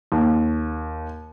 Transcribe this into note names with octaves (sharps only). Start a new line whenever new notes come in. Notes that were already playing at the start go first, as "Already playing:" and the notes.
D#2